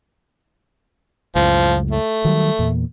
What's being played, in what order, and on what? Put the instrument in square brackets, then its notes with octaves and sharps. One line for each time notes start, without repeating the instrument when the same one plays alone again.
[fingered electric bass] C#2 F#2 A2 [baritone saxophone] F3
[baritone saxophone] A3
[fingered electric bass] D#3 F#3 G3
E2 A#2